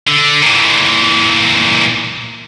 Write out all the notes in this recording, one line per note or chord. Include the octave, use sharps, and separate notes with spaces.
D3
A#2 E3